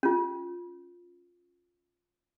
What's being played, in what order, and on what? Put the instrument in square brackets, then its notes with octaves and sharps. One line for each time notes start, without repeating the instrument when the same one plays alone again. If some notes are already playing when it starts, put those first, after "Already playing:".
[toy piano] C#4 F4